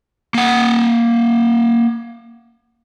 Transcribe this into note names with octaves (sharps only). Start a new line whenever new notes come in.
A#3 F#5